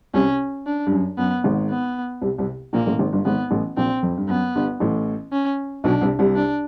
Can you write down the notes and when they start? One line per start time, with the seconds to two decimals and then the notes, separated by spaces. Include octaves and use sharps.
0.14 C2 C3 C#4
0.66 D4
0.87 G2
0.92 F#2
1.18 F#2 B3
1.44 G#1 G#2
1.70 B3
2.21 C2 C3
2.38 C2 C3
2.73 A#1 A#2 A#3
2.86 A1 A2
2.99 G#1 G#2
3.12 G1 G2
3.25 G#1 G#2 B3
3.51 A1 A2
3.77 A#1 A#2 C4
4.03 F2
4.17 G2
4.28 F#2 B3
4.56 G1 G2
4.80 A1 A2
5.32 C#4
5.84 B1 B2 D4
6.01 C2 C3
6.19 C2 C3
6.36 D4